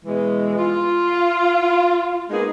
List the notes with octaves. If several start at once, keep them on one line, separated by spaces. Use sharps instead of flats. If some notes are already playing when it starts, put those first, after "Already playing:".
B2 E3 G#3
F4
G#3 A#3 B3 D#4 G#4